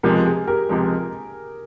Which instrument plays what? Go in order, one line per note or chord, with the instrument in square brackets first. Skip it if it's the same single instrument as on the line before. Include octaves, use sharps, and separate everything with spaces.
[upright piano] C#2 C3 F3 G#3 [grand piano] G4 A#4
[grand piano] G#4
G4 A#4
[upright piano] C#2 C3 F3 G#3